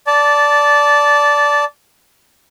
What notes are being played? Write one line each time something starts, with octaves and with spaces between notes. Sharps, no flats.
D5 A5